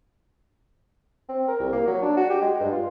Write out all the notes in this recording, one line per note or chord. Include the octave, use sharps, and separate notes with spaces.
C4
A#4
C2
A#3
F#3
D4
F#4
G4
G#3
G2
F4